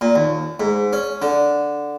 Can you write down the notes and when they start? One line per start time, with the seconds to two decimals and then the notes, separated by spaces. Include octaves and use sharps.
0.01 A#2
0.15 D#2
0.60 G#2
0.93 C#4
1.22 D3